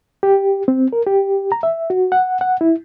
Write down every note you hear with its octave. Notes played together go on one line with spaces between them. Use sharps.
G4
C4
A#4
G4
A#5
E5
F#4
F#5
F#5
E4